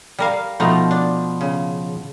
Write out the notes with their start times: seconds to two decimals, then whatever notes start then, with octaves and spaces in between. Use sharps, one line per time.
0.18 G3 A#4 F5
0.60 B2 F3 A3 D#4 F5
0.91 D4
1.41 C#3